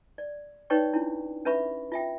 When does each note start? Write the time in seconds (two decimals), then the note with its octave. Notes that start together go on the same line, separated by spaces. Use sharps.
0.18 D5
0.70 D#4 B4 C#5 D5 G5 C#6
0.93 C#4 D4 E4 F4
1.45 C#4 B4 E5 B5 C#6
1.92 F4 E5 G5